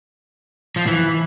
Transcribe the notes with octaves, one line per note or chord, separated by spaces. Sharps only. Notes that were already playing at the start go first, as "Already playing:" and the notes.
F3
E3